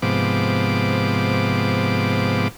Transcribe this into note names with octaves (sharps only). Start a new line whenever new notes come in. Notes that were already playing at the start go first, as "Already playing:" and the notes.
G#2 C3 F3 B3 D6